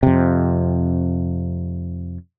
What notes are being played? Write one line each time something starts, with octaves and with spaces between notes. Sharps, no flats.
F2 C3